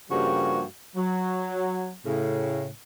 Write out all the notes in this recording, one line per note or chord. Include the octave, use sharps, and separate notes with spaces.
G2 C#3 F3 G3 A#3 F#4
F#3
A2 C#3